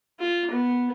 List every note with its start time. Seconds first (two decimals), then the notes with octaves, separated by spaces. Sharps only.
0.19 F4
0.51 B3